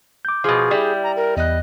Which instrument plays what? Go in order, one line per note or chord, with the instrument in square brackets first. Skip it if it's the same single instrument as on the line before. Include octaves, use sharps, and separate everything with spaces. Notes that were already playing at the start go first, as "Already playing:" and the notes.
[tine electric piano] D6 G6
[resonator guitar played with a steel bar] B2 F3 [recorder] G#4
[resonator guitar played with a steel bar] G3 E4
[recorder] A#5
A#4
[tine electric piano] E2 F#6 [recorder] D#5